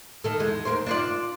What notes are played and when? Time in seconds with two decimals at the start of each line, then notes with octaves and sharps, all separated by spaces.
0.24 D#3 A4
0.40 E2 G#3
0.65 D#2 A#4 C5
0.86 D4 F4 D5